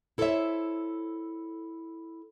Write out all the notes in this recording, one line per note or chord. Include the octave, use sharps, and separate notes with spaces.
E4 A4 A#4 C5 C#5 E5